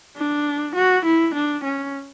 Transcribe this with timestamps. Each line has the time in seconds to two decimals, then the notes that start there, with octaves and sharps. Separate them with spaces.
0.17 D4
0.76 F#4
1.05 E4
1.34 D4
1.64 C#4